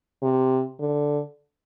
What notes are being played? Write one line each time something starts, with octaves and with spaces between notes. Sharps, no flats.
C3
D3